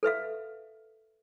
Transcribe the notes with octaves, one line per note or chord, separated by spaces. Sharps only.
A4 B4 E5 F5